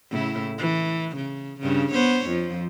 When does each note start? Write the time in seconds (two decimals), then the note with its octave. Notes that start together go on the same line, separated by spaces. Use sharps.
0.10 A2 C#3 E4
0.58 E3
1.16 C#3
1.60 G2 C#3
1.91 B3 C5 C#5
2.27 F2 F3